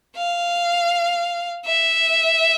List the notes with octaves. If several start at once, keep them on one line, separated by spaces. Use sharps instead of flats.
F5
E5